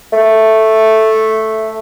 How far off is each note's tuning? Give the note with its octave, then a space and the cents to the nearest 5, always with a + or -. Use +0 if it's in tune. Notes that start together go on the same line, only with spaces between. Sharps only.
A3 +0